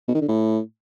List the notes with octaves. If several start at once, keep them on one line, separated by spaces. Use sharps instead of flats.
B2
D#3
D3
A2